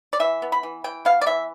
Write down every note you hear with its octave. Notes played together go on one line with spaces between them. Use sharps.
D5
E3 E5
B3
B5
E3
E3 G5
B3 F5
D5
E3 E5